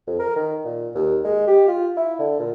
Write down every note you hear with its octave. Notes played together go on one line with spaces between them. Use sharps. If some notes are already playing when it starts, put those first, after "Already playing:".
F2
A#4
D#3
A#2
D#2
G#3
G4
F4
E4
D3
A#2